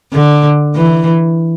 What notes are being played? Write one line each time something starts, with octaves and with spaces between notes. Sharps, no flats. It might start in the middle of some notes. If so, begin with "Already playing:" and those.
D3
E3